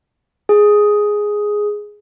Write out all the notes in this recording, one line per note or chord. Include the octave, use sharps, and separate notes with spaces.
G#4